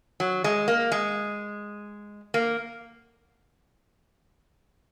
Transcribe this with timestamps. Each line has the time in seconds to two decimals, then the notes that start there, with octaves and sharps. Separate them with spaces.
0.20 F#3
0.44 G#3
0.68 A#3
0.92 G#3
2.34 A#3